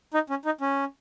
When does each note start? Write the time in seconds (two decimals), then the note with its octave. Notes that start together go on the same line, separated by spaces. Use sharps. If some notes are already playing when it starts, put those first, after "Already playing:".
0.14 D#4
0.30 C#4
0.45 D#4
0.61 C#4